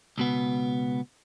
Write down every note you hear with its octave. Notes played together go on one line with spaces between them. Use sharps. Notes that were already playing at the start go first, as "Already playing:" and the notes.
C#2 B2 B3